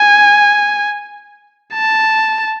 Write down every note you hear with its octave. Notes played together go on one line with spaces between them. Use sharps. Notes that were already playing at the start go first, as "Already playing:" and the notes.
Already playing: G#5
A5